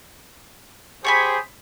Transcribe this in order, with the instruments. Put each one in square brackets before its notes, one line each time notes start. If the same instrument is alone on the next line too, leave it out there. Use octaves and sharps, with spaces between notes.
[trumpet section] G4 G#4 C5 [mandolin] C#5 G#5 B5